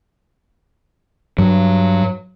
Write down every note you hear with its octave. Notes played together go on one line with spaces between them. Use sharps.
G2 F#3